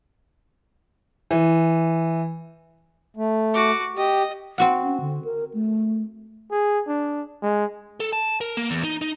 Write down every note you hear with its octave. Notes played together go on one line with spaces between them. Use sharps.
E3
A3
F#4 D6
G4 D#5
C4 F#4 F#5
C#4
D3
A#4
A3
G#4
D4
G#3
A4
A5
A#4
A#3
E2
D#4
D#4